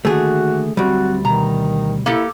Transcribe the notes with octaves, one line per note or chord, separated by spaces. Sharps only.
D3 D#3 A3 A#3 F#4 G#4
D2 F#3 G3 C4 F#4
B2 D#3 A#5
A#3 E4 G4 A4